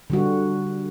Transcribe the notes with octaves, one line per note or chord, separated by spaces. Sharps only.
D3 G3 F#4